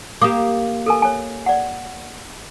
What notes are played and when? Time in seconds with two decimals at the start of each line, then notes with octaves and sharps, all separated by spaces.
0.22 A#3 G4 D6 D#6
0.86 A4 A#4 G#5
1.02 C#5 G#5
1.46 D5 F#5